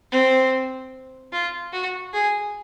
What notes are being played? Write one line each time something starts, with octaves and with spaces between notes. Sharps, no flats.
C4
F4
F#4
G#4